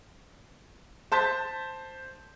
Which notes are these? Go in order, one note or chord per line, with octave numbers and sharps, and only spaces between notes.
C5 A5 G6 B6